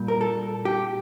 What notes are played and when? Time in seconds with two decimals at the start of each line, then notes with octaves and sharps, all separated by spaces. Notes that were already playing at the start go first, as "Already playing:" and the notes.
Already playing: A#2 G3
0.08 A#4
0.21 A4
0.65 G4